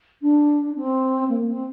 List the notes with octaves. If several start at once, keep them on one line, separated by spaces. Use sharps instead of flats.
D4
C4
A#3
C4